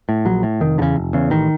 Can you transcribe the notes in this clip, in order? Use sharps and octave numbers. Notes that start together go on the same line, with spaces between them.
A2
A#1 F#3
A2
F1 D#3
E2 C#3 D3
F1
E2 C#3
A1 D#3